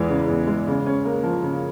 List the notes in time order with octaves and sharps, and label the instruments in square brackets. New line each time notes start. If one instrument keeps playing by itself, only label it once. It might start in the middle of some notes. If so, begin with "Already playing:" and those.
Already playing: [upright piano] E2 E3 G#3
C#3
E2
G#3
C#3
C#4
A#3
F3
C#3